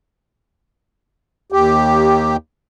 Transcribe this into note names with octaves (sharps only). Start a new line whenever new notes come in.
D#2 G4